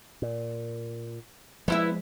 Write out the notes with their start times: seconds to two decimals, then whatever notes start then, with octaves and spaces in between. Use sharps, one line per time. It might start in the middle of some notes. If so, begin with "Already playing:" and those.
0.22 A#2
1.68 F3 G3 G#3 B3 E4 E5